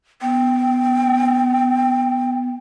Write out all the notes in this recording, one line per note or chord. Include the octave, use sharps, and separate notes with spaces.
B3 G5